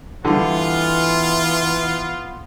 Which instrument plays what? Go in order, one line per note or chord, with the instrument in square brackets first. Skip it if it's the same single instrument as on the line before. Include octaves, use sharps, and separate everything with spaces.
[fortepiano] D3 G3 [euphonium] E3 [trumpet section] B3 F4